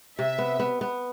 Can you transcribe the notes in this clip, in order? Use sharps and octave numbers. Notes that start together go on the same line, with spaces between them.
C3 E5
B3
B3
B3